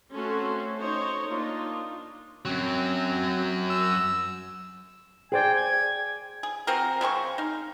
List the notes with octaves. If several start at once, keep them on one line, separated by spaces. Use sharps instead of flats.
A3 C4 C#4 F#4 A4 C6
D#4 C5 C#5
A#3 D4 D#4 F4
F#2 F#3 C4
E6
G#4 C5 D5 G5 G#5
G#6
G#4
C4 F4 F#4 A#4
C#3 G#3 C4 C#6
D#4 F5